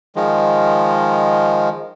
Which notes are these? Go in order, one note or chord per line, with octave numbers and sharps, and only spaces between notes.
D#3 F3 G#3